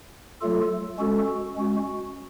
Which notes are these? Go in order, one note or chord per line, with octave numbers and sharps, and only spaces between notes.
F#3 A3 F4 A4
G#3 C#4 F#4 A4
G#3 C#4 F#4